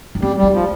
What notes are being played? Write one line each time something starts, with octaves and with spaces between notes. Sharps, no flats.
D#4
G3 C4
G3
D#4
F3